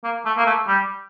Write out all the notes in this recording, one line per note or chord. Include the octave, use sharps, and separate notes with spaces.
A#3
A3
A#3
A3
G3